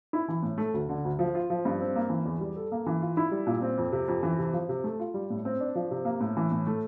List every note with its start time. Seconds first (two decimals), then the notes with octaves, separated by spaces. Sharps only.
0.13 E4
0.28 E3
0.43 A2
0.58 A3
0.74 D2
0.89 D3
1.04 D2
1.19 F3
1.35 F4
1.50 F3
1.65 G2
1.80 C4
1.96 A#3
2.10 E3
2.25 E2
2.40 G3
2.56 A4
2.72 A#3
2.86 E3
3.01 F4
3.17 E4
3.31 G3
3.47 A#2
3.62 C4
3.78 F2
3.92 C3
4.08 F2
4.23 E3
4.39 C3
4.53 F3
4.69 C3
4.84 A3
4.99 F4
5.14 G3
5.30 A2
5.45 C4
5.60 D4
5.75 F3
5.91 C3
6.05 A#3
6.20 A2
6.37 E3
6.52 A2
6.67 A3